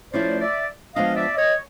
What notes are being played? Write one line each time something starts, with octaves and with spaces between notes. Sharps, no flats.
F3 A3 C#4 E4 C5 D5
D5 E5
F3 G#3 B3 D4 F4 D#5 F5
D5 E5
C#5 D#5